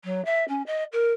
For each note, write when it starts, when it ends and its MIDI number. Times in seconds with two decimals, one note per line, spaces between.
0.04 0.24 54
0.25 0.44 76
0.48 0.62 61
0.66 0.83 75
0.92 1.12 70